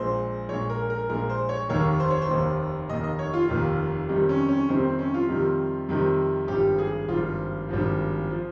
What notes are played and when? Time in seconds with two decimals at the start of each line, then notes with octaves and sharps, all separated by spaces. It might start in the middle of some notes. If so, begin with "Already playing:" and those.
Already playing: A#1 A#2 G#3 C5
0.49 A#1 A#2 G#3 C#5
0.70 A#4
0.90 A#4
1.09 A#1 A#2 G#3 A#4
1.29 C5
1.49 C#5
1.69 F1 D#2 D#3 A#3 C#5
2.00 C5
2.10 C#5
2.22 C5
2.30 F1 D#2 D#3 A#3
2.89 F1 D#2 D#3 A#3 D#5
3.04 D#5
3.19 C#5
3.33 F4
3.48 F1 D#2 D#3 A#3
4.09 F2 C3 D#3 G3
4.29 C#4
4.49 C#4
4.69 F2 C3 D#3 G3 C4
4.84 C4
4.99 C#4
5.14 F4
5.29 F2 C3 D#3 G3
5.89 F2 C3 D#3 G3
6.48 G#1 G2 F3 G4
6.78 G#4
7.08 G#1 G2 F3 F4
7.69 G#1 G2 F3
8.30 F3